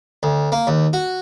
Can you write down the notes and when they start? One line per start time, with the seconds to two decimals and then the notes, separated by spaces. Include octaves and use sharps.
0.23 D2
0.52 A#3
0.67 D#2
0.93 F#4